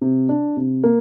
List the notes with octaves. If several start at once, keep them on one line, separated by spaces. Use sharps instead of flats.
C3
D4
C3
A#3